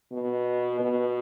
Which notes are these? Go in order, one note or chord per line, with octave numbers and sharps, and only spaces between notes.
B2
B2